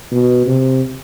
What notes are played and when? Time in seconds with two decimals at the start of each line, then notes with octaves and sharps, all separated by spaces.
0.12 B2
0.46 C3